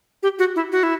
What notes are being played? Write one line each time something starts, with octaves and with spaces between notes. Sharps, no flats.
G4
F#4
E4
F#4
E4